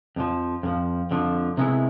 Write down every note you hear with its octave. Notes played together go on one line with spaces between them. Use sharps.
F2 D3 F3
F2 D3 F3
F2 D3 F3
C3 D#3 G#3 B3 E4